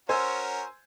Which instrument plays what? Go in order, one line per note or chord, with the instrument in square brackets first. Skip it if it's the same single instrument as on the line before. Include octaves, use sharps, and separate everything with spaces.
[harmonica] C#4 F#4 A#4 [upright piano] C5 G#5 E6